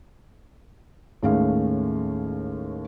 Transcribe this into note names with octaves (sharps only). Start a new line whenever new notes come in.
D#2 A2 G#3 A3 C#4 F5